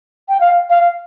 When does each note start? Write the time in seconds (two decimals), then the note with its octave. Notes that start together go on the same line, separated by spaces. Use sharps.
0.29 G5
0.40 F5
0.70 F5